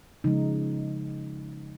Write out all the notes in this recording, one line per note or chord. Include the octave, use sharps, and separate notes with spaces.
C#3 F3 G#3 D#4